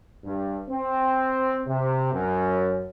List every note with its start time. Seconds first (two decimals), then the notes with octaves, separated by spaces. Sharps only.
0.24 G2
0.70 C4
1.67 C3
2.13 F#2